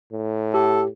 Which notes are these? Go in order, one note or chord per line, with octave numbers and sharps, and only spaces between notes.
A2
G4 A4